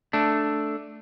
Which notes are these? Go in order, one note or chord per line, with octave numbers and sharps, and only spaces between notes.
A3 D4